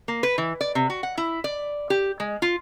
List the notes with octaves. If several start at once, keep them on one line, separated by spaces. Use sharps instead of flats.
A#3
B4
E3
D5
C3
F#4
F#5
E4
D5
G4
G#3
F4